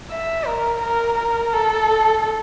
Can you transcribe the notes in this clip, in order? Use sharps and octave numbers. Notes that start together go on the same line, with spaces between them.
E5
A#4
A#4
A#4
A4